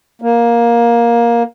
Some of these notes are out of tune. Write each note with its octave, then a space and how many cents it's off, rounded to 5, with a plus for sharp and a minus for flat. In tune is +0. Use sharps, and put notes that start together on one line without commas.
A#3 +10